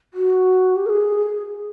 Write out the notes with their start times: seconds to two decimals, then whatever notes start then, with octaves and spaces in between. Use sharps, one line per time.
0.14 F#4
0.76 G4
0.86 A#4
0.89 G#4